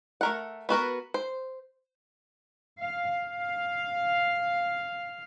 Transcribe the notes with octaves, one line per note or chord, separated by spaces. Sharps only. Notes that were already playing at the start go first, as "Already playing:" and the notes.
A3 A#4 F#5
B3 F#4 A#4 B4
C5
F5
F5